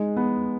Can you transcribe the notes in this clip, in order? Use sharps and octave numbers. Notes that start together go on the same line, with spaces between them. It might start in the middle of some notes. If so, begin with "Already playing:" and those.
Already playing: G#3 D#4
B3